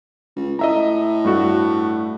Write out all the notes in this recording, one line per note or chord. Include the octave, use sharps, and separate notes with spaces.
C#2
A2 D#5 E5 A#5
G2 A3 F#4